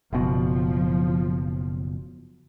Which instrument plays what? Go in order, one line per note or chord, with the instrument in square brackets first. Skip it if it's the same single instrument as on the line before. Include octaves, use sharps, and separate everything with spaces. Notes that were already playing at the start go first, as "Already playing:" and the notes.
[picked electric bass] F#1 B2 [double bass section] F3